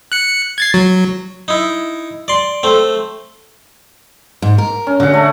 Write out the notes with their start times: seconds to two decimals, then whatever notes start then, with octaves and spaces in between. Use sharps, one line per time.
0.12 F#6 C#7
0.58 G#6 A6 C7
0.74 F#3
1.48 D#4 E4
2.28 D5 C6
2.63 A3 C4
4.42 G#2
4.58 A#4
4.87 C#4
5.00 D3 F#4 F#5
5.13 A3